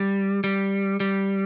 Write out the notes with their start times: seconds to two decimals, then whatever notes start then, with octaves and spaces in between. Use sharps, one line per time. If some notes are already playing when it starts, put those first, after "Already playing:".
Already playing: G3
0.44 G3
1.00 G3